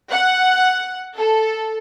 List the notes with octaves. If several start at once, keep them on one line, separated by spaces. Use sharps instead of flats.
F#5
A4